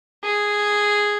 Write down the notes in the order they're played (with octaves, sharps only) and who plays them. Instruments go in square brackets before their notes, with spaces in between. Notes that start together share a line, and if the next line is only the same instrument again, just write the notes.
[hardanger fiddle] G#4